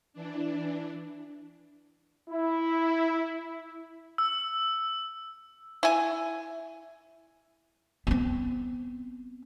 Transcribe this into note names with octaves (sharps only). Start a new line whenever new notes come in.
E3 D4
E4
E6
E4 G#5
B3 C4